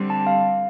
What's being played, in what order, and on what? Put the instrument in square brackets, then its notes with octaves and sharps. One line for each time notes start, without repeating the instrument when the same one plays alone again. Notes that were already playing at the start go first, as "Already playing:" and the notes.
Already playing: [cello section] D3 G3 C4
[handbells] A5
F5